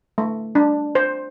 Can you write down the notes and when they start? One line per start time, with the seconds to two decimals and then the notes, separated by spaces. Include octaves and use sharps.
0.18 A3
0.55 D4
0.95 C5